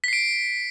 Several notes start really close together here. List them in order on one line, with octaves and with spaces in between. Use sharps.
B6 C7 D7